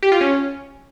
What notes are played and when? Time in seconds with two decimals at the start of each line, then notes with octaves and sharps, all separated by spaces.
0.03 G4
0.12 F4
0.21 C#4